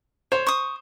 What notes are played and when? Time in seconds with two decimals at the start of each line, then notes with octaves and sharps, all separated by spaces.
0.32 C5 C#5
0.47 C#6 D#6